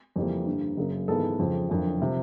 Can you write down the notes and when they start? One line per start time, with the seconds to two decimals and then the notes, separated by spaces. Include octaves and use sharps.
0.16 F2 C#3 E3 G3 A#3
0.46 G2 D3 G3 A#3
0.77 F#2 C#3 F#3 A#3
1.08 G#1 G#2 E3 G#3 B3 A4
1.39 F2 C#3 F3
1.69 F#1 F2 D3
2.02 C3 F3